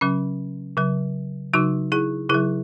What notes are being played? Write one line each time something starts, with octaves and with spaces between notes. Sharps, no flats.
C#3 F#3 C#4
C#3 F#3
C#3 F#3 D#4 F#4
E4 G#4
C#3 F#3 E4 G#4